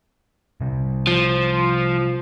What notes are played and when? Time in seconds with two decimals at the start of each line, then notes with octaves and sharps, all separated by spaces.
0.61 C3 G3
1.07 F3